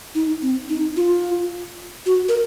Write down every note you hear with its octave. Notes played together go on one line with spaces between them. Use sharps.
D#4
C4
D#4
F4
F#4
A#4